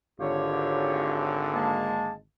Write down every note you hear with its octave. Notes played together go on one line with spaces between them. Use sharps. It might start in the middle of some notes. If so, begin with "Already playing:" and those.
G#1 D3 F4 G4 C#5
G#3 A#3 A5